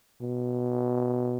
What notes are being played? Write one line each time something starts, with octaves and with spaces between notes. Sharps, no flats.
B2